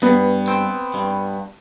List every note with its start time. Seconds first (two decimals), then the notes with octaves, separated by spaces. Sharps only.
0.02 G2 B3
0.48 C4
0.94 G2